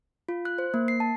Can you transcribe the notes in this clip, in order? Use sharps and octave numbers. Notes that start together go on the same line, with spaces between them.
F4
F#6
C5
A#3
C7
A5